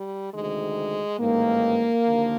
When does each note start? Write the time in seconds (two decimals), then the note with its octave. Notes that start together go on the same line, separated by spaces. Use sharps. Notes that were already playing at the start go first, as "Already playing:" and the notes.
Already playing: G3
0.32 D2 C3 D#3 G#3
1.19 A1 G#2 D#3 A#3
2.05 D#2 D3 F3